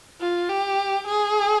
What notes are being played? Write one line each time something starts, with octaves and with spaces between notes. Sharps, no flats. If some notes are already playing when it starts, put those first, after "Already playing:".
F4
G4
G#4